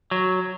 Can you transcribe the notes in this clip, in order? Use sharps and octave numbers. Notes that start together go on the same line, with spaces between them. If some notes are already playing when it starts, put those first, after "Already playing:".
F#3